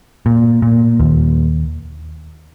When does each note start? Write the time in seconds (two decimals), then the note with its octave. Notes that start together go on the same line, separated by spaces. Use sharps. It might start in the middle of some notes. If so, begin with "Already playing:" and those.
0.26 A#2
0.62 A#2
1.00 D#2